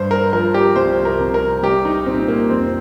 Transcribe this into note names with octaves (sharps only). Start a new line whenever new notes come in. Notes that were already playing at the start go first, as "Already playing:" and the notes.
Already playing: G2 C5
A#4
F3 A#4
G4
C2 C5
A#4
C3
A#4
C2 G4
D#4
A#2 C4
A#3
F2 C4